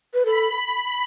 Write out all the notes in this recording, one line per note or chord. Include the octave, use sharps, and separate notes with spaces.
B4
A4 B5